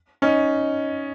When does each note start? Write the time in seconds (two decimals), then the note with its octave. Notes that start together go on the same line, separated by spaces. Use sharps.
0.22 C#4 D#4